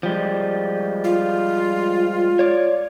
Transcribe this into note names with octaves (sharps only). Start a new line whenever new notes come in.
F3 G3 G#3
F4
C#5 D5